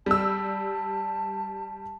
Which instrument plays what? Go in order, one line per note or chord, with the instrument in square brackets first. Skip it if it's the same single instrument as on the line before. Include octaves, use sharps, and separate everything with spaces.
[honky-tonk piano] G3 E6 [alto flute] A5